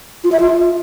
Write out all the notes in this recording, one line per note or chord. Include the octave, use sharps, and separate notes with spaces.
F4
E5
F4